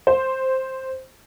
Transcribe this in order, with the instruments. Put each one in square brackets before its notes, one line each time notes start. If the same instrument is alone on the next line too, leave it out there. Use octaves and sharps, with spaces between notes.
[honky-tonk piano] C5